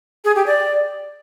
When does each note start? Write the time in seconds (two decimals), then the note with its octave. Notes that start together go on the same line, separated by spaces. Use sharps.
0.25 G#4
0.35 G4
0.46 D5